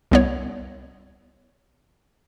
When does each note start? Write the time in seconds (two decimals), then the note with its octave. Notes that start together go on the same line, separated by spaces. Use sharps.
0.11 C2 B3 C#5